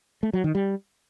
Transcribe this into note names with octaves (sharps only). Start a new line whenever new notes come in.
A3
F#3
D#3
G3